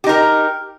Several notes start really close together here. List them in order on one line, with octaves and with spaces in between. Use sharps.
G4 D#4 A#4